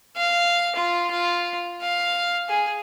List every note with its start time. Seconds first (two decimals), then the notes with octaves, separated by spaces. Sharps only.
0.17 F5
0.76 F4
1.11 F4
1.82 F5
2.49 G#4